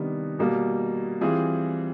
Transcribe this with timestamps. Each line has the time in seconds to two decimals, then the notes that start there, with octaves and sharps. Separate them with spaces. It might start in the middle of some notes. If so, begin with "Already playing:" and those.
Already playing: C3 D#3 G3 B3 D4
0.39 B2 G3 A#3
1.21 E3 G3 C4 F4 G#4